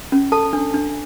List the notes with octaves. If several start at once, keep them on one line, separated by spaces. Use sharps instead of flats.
C#4
A4 A5
D4
D4